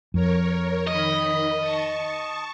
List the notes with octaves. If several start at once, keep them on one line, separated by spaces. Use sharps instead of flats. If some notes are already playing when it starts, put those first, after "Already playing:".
F2 A#4 C#5
D#3 D#5 B5
A5 C#6